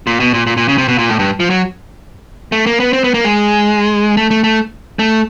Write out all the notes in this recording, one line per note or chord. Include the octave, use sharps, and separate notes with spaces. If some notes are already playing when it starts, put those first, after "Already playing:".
A#2
B2
A#2
A#2
A#2
C#3
C3
B2
A#2
A2
G2
F3
F#3
A3
A#3
B3
C4
B3
A#3
G#3
A3
A3
A3
A3